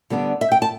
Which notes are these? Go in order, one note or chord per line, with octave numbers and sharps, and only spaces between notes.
D3 G3 B3 D4
E5
G5
A5